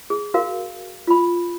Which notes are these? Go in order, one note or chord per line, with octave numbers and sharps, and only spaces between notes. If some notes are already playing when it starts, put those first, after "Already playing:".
G#4
F#4 A#4 F5
F4 B5